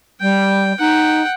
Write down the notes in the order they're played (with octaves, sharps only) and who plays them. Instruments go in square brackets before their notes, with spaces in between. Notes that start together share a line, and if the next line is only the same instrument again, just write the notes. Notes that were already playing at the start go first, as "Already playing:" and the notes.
[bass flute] G3 [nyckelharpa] G5
[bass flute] D#4 [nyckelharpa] F#5 G5